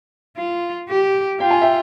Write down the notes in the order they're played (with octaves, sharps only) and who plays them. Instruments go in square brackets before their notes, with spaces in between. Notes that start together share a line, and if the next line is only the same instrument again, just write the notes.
[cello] F4
G4
[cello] F4 [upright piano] G5
[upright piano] G#5
E5 G5